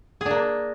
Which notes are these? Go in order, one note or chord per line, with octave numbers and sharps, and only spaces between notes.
A#3 D4 G#4